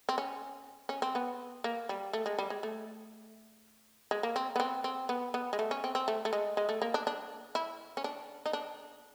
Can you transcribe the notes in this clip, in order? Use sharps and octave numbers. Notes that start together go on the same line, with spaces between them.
C4
C#4
C#4
C4
B3
A#3
G3
A3
G#3
G3
G#3
A3
G#3
A#3
C4
B3
C4
C4
B3
B3
G#3
A3
C#4
C4
C4
A3
A3
G#3
G#3
A3
A#3
D4
D4
E4
C#4
D4
D#4
D4